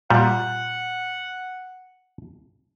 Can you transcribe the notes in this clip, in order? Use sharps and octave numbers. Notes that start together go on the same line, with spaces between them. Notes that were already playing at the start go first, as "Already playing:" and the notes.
A#2 G3 F#5